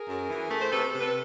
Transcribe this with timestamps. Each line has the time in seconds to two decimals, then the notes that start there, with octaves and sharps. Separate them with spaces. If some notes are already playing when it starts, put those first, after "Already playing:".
Already playing: G#4 A#4
0.08 F#2
0.30 E3
0.51 A3
0.60 C5
0.72 C3 A4 B4
0.93 C3
1.01 A4 B4